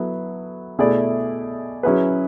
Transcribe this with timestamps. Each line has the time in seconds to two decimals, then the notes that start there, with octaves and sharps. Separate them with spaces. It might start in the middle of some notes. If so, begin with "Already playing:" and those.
Already playing: F#3 B3 E4 A4
0.79 B2 A3 E4 G#4 D5
1.83 F#3 C#4 E4 G#4 B4